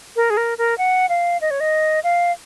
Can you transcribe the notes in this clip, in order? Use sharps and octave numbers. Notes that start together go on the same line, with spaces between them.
A#4
G#4
A#4
A#4
F#5
F5
D#5
C#5
D#5
F5